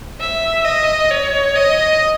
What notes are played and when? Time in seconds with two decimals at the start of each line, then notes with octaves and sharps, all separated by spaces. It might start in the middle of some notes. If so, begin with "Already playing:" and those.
0.20 E5
0.65 D#5
1.10 C#5
1.55 D#5